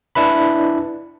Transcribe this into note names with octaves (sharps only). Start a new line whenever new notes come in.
D4 E4 B4 B5